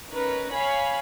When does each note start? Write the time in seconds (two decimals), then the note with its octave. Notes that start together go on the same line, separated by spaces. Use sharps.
0.10 C#4 D#4 A#4 B4
0.52 C#5 F5 G#5 B5